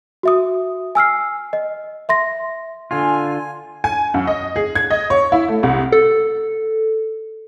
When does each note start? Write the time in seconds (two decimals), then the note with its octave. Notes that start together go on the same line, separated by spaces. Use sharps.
0.23 F#4 E5 D#6
0.95 G#5 E6 F6 C7
1.53 D#5
2.09 E5 C6 A#6
2.91 D3 F4 G#5
3.84 G#5
4.14 F#2
4.27 D#5
4.56 G#4
4.76 G#6
4.90 D#5
5.10 C#5
5.32 E4
5.48 A3
5.63 C2
5.92 A4